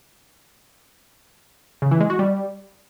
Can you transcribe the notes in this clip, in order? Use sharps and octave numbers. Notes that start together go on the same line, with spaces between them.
C#3
E3
G#3
F#4
G3